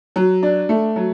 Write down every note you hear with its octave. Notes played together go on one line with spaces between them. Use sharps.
F#3
D4
A3
F#3